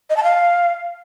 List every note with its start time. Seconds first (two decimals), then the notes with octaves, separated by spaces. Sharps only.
0.10 D#5
0.17 A5
0.24 F5